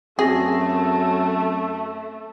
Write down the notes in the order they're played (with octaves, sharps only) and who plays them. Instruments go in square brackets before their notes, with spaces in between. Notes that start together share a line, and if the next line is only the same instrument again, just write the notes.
[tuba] F#2 [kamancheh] A3 [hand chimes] C4 F#4 A#6 [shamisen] G#4